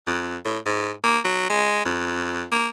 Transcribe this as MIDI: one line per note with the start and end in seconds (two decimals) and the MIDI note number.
0.07 0.37 41
0.45 0.58 45
0.66 0.91 44
1.04 1.19 58
1.25 1.45 54
1.50 1.82 56
1.85 2.44 41
2.51 2.68 58